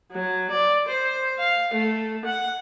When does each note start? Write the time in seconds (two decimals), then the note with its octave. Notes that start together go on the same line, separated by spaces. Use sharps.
0.13 F#3
0.51 D5
0.88 C5
1.39 F5
1.74 A3
2.26 F#5